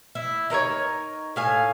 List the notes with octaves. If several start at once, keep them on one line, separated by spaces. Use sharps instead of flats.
E4
D#4 A#4 C5 C#5
A2 F5 G#5